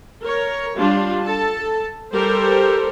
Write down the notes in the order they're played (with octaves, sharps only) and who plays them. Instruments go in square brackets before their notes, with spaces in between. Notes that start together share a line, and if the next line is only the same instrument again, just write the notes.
[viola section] A#4 C#5
G3 D4 F4
A4 A5
G3 G4 A4 A#4 C5